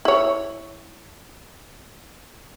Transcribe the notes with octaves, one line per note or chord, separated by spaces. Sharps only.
E4 C#5